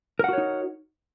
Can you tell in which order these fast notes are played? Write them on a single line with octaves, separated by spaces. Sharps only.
A#4 F#5 F#4 C#5 D#4